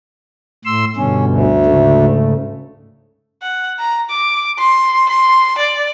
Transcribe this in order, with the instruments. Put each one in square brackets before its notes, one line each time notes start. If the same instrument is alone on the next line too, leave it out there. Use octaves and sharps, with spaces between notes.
[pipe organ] A2 C6 E6
[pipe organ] G2 B2 D3 [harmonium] C#4
[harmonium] D2
[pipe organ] G#2 C#3 A3
[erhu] F#5
A#5
D6
C6
C6
D5